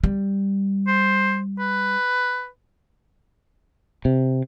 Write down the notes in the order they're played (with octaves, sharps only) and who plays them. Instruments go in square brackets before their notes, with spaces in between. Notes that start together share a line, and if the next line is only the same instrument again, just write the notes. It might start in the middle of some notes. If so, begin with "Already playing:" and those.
[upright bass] G3
[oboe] C5
B4
[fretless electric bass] C3